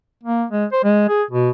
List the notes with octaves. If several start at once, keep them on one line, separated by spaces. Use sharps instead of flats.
A#3
G#3
C5
G#3
G#4
B2